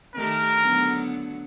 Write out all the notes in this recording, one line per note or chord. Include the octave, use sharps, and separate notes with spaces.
D#3 A3 G4 A#4
D3 F#3 B3